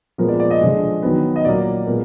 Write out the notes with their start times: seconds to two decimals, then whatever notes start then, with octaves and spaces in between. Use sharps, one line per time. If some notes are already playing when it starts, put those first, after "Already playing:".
0.18 A#2 F3 G#3 B3 A#4
0.28 D5
0.40 D5
0.51 D#5
0.61 D3 F3 G#3
1.02 D#3 F#3 B3
1.36 D#5
1.44 A#2 F#3 A#3 D5
1.86 A#2 G#3 B3 A#4